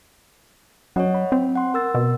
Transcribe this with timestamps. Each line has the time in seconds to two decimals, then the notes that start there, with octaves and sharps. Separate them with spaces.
0.96 F#2 C#5 D#5 F#5
1.15 B5
1.32 C4
1.55 F#5 C6
1.74 A#4 E6 A6
1.94 B2